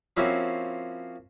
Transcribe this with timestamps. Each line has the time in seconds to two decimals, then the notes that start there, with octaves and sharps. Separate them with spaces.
0.17 F3 A#3 C4 C#4 E4 F#4